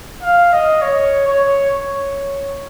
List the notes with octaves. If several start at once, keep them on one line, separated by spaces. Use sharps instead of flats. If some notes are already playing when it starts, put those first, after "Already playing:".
F5
D#5
C#5
C#5
C#5